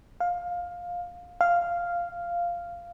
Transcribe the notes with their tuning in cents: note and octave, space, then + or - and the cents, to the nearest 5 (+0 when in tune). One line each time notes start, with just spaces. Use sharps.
F5 +15
F5 -5